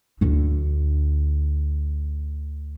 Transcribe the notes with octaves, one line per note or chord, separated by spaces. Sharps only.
D2 D3